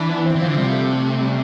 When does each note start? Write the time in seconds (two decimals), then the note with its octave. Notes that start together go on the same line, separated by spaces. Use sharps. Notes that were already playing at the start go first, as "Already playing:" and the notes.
Already playing: E3 D4 E4
0.09 B3
0.25 C4
0.35 E3
0.41 D3 F3
0.57 C3 G3
0.72 A3
1.21 G3